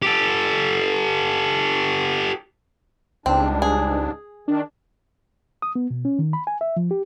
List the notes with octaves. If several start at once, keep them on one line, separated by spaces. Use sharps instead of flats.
G4 A4
C#2 G#2 G3 C4 D4
G#4
D#3 D4
D#6
B3
B2
C#4
D#3
B5
G#5
E5
F3
G4